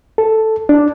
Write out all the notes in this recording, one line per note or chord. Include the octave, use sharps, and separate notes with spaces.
A4
D4